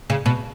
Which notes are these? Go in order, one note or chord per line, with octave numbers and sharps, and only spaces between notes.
C#3
B2